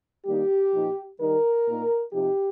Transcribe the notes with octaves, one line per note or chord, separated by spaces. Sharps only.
D#3 G3 A#3 D#4 G4
A#2 F3 D#4
D#3 G3 D#4 A#4
A#2 A#3 D#4
C3 F3 D#4 G4